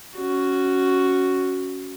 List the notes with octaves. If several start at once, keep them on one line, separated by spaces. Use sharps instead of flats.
C#4 F#4